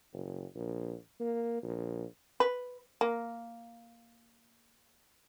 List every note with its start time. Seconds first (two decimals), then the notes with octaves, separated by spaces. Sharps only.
0.13 F#1
0.55 A#1
1.20 A#3
1.63 A#1
2.40 B4
3.01 A#3